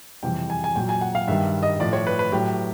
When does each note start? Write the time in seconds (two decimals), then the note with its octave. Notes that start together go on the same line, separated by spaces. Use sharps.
0.23 F2 C3 E3 G3 G5
0.50 G#5
0.64 G#5
0.76 A#2 F#3 G5
0.89 G#5
1.01 F#5
1.15 F5
1.27 G2 D#3 G3 E5
1.63 D#5
1.80 A2 F3 D5
1.93 C#5
2.07 B4
2.19 B4
2.32 A2 F#3 G4